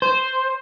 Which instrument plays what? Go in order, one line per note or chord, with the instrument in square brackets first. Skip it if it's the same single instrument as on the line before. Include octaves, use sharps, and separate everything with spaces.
[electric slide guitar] C5